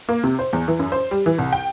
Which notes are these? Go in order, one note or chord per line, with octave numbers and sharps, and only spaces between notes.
A#3
C3
C5
E2
E3
F#2
C5
G3
E3
C2
G5